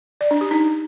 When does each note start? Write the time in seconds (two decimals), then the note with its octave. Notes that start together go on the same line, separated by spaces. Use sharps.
0.21 D5
0.31 D4
0.41 G4
0.51 D#4